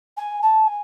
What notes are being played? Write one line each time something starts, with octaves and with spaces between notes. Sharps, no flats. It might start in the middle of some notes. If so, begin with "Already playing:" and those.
G#5
A5
G#5